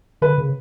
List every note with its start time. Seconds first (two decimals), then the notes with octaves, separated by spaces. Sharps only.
0.22 D3 B4
0.38 C#3